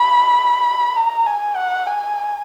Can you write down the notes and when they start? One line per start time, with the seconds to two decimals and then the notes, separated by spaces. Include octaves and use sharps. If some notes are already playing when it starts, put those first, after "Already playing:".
Already playing: B5
0.96 A#5
1.26 G#5
1.56 F#5
1.87 G#5